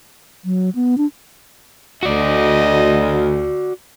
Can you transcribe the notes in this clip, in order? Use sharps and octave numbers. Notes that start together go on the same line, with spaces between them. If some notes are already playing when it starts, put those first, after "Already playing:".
F#3
B3
D4
D2 F#4 D5 D#5